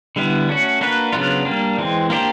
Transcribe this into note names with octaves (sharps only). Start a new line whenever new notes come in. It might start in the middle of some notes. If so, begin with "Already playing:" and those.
D3 G3 B3 E4
A3 C#4 F#4
A#3 D4 F#4 B4
C#3 F#3 B3 D4 F4
G3 A#3 D4
E3 G#3 C4
A#3 D4 G4 C5